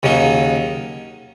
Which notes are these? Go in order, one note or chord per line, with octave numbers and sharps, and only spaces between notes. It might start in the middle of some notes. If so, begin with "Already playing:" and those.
D#2 C#3 F#3 D#4